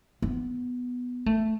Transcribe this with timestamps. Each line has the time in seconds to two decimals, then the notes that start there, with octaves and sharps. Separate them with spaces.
0.22 B3
1.26 A3